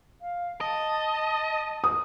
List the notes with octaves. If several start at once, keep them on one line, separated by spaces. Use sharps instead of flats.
F5
D#5 A5
D#6